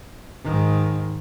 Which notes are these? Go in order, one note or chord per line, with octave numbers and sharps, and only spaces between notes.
G#2 D#3